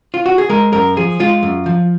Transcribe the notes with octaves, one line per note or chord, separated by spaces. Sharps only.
F4
F#4
G#4
G#3 A#4
F#2 A#4
F3 G#4
G#3 F4
F#2
F3